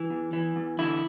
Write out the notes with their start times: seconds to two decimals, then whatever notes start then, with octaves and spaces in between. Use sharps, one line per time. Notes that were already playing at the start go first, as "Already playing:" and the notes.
Already playing: E3
0.10 E2
0.33 E3
0.56 E2
0.79 D3 E4